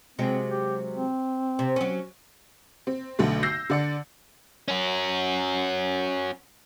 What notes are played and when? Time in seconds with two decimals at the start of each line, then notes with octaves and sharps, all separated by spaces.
0.19 C3 F#3 G#3 C4
0.50 G4
0.93 C4
1.59 C3
1.76 F#3 C#4
2.87 C4
3.19 B1 D3 A3
3.43 E6 G6 A#6 C7
3.70 D3 D5 C#7
4.68 C#4 F#4